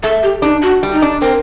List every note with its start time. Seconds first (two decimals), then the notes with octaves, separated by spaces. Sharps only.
0.03 A3 A4
0.23 G4
0.42 D4 D#4
0.63 F#4
0.83 G3
0.92 D#4
1.02 D4
1.22 C4 A#4